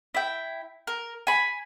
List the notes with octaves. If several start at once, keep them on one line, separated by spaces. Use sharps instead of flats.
E4 G5
A#4
G#5 B5